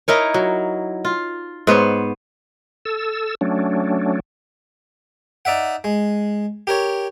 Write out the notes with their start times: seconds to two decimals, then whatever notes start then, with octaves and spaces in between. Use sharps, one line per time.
0.08 D#4 E4 A#4 C#5
0.34 F#3
1.05 F4
1.67 G#2 B3 C5 C#5
2.85 A4 E6
3.41 F#3 A3 C#4 D4
5.45 D#4 D5 E5 F#5
5.84 G#3
6.67 G4 A#4 C#5